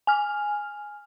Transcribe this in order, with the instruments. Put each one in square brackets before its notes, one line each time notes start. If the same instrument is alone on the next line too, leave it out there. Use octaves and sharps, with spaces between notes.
[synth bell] G#5 F6